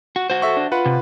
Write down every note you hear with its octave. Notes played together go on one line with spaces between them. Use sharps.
F#4
F#4 C5
A4 E5 C#6
D4
F4 B4 F#5
C3